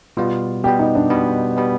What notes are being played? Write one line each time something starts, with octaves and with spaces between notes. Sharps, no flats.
B2 G3 B3 F4
B2 G3 B3 G4
D#4
D4
B2 G3 B3
B2 G3 B3